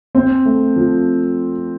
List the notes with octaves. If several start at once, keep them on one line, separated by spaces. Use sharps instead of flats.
C4
A3
F3